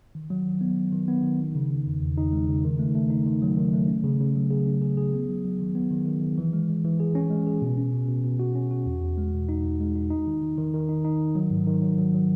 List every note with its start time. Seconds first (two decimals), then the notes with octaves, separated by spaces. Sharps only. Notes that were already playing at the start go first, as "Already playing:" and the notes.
0.15 D#3
0.30 F#3
0.46 D#3
0.61 B3
0.77 D#3
0.92 D#3
1.08 B3
1.23 D#3
1.39 D#4
1.55 C#3
1.70 C#3
1.86 E2
2.02 E2
2.18 D#4
2.33 G#3
2.48 C#3
2.64 D#3
2.79 A3
2.95 A3
3.10 D#4
3.26 D#3
3.42 F#3
3.57 D#3
3.73 A3
3.88 C#4
4.04 C#3
4.20 C#3
4.35 F#3
4.51 G#4
4.66 C#4
4.82 G#4
4.97 G#4
5.14 B3
5.29 F#3
5.44 F#3
5.60 D#3
5.75 B3
5.91 D#3
6.06 D#3
6.22 D#3
6.38 E3
6.53 G#3
6.69 G#3
6.85 E3
7.00 G#4
7.15 C#4
7.31 G#3
7.47 G#4
7.62 B2
7.77 C#4
7.93 B2
8.08 B2
8.24 B2
8.40 F#4
8.55 C#4
8.71 F#4
8.86 E2
9.02 E2
9.17 G#3
9.33 B2
9.49 D#4
9.65 E2
9.80 G#3
9.95 D#4
10.10 D#4
10.27 D#3
10.42 D#3
10.58 D#3
10.74 D#3
10.89 D#4
11.05 D#4
11.20 D#3
11.35 F#3
11.51 G#2
11.67 D#3
11.82 F#3
11.98 F#3
12.14 F#3